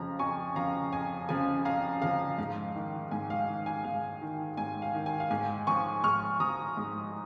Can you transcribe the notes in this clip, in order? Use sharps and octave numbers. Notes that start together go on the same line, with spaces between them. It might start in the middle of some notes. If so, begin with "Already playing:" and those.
Already playing: F2 C#3 F3 A#5
F2 G#5 C#6
C#3 F3 F5 A#5
F2 G#5
C#3 F3 G#5
F2 F5 A#5
C#3 F3 F5 A#5
G#2 F5
D#3
G#2 G#5
F5
D#3
G#5
G#2 F5
D#3
G#2 G#5
F5
D#3
G#5
F5
G#2 G#5
F3 G#5 C#6
G#2 C#6 F6
F3 A#5 D#6
G#2